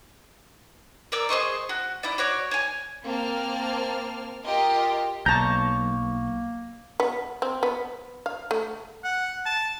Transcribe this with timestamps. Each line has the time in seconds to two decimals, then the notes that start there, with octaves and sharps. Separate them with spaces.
1.12 A#4 D5 D6 E6
1.29 G#4 C5 D#5 C#6
1.69 F#4
2.03 E4 D5
2.18 F#4 C#5 D5
2.51 C#5 G#5
3.05 A#3 C4 A5 F6
4.44 F4 G4 A#4 D#5
5.26 B1 A#3 A5 A#5 C#6 G6
7.00 B3
7.42 C4
7.63 B3
8.26 F5
8.51 A3
9.04 F#5
9.45 A5